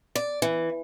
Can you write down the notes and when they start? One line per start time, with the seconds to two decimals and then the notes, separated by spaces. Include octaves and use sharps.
0.15 D5
0.42 E3